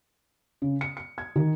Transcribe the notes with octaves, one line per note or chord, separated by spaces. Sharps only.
C#3
C#7
C#7
G#6
D#3